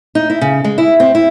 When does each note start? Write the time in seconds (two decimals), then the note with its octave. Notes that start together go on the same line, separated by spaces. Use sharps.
0.15 D#4
0.30 E4
0.41 C#3
0.64 G#3
0.78 E4
1.00 C4
1.15 E4